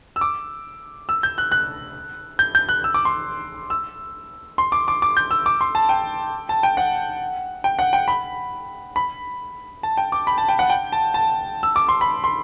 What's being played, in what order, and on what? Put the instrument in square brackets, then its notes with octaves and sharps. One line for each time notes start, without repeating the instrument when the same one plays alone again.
[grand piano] E6
D6
E6
G6
F#6
F#6
G6
G6
F#6
E6
D6
C6
E6
C6
D6
D6
D6
G6
E6
D6
C6
A5
G5
A5
G5
F#5
G5
F#5
G5
B5
B5
A5
G5
D6
B5
A5
G5
F#5
G5
A5
A5
E6
D6
C6
B5
C6